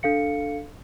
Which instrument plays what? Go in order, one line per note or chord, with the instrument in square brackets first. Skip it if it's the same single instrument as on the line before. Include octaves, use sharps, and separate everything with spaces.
[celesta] D4 A4 F5 C#7